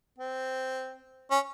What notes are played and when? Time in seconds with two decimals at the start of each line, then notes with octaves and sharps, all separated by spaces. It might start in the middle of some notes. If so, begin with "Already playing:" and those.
0.18 C4
1.31 C#4